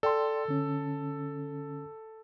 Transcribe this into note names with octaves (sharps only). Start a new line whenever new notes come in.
A4 D5 G5 C6
D3 C#4